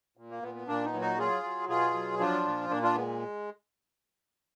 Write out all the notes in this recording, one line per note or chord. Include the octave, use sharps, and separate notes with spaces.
A#2
A#3
A#2 B3
B3
A#2 A#3 D4
B3 D#4
F#3
D#4 F#4
F#3 F4 G#4
F#3
B2 F4 G#4
F#3
F3 D4 F4
A#2
A#2 A#3 D4
D4 F4
G#3 B3